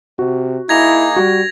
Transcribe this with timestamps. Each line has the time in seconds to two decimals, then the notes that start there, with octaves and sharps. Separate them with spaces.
0.19 C3 F#4
0.69 A#3 D#4 E4 G#4 G#6 A#6 F7
1.16 G3 F#4